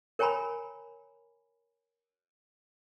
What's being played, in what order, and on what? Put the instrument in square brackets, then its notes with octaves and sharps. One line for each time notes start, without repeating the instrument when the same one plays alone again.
[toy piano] A#4 C#5 G5 G#5 A#5 B5